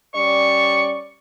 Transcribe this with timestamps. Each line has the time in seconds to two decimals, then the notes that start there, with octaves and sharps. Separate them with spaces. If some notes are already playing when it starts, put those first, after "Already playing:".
0.14 G3 C#4 D5 C#6